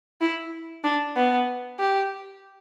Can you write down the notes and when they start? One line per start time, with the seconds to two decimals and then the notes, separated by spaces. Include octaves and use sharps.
0.21 E4
0.84 D4
1.16 B3
1.79 G4